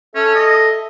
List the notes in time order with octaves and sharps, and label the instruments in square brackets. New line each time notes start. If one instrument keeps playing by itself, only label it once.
[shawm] C#4 [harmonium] A4 E5
[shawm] D#5